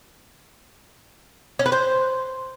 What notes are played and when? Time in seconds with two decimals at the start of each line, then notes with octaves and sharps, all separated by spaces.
1.59 C#4
1.66 B4
1.72 C5